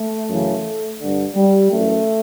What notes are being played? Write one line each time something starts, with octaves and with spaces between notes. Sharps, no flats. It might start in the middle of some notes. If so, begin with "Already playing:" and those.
Already playing: A3
F#2 C#3 E3
G2 D3
G3
F#2 E3 A3